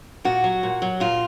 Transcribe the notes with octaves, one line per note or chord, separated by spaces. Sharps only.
A#2 F#4
F#3
A#2
F#3
A#2 F4